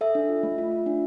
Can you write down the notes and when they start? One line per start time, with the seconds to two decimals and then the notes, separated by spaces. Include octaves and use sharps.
0.01 A4 E5
0.15 D4
0.29 F4
0.43 A3
0.58 F4
0.72 F4
0.86 D4